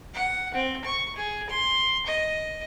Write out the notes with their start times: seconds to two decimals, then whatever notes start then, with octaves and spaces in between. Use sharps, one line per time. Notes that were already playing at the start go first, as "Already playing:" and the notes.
0.14 F#5
0.54 C4
0.85 C#6
1.16 G#4
1.50 C6
2.06 D#5